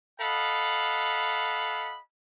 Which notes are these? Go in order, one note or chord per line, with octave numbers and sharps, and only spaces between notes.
A4 D#5 F5 F#5 B5